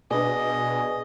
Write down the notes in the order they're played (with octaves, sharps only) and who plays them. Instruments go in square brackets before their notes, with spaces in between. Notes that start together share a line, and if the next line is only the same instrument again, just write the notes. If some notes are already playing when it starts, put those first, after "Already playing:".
[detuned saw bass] B2 [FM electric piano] D4 B4 D5 [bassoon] G#4 [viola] D#5